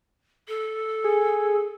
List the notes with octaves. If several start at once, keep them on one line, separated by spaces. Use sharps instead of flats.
A4
G#4